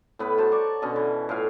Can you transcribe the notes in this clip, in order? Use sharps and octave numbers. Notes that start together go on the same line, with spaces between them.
A2 B3 B4 B5
F#4 C5 A5 A#5
C#5 D5 C#6 D6
B2 D3 C#4 D#5
E3
A2 F4 F5